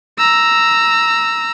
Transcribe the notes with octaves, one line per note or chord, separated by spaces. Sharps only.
A#5 E6